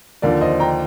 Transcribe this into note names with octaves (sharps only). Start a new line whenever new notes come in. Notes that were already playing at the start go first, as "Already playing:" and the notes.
D#2 D3 F3 A#4 D5
C5 D#5
G5 A#5